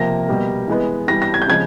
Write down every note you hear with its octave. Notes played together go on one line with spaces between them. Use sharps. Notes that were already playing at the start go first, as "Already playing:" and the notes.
Already playing: C3 F3 A#3 A#6
B2 G3 A#3
E3 G#3 B3
E3 G3 B3 A#6
A#6
G#6
G6
C#3 F3 G#3 G#6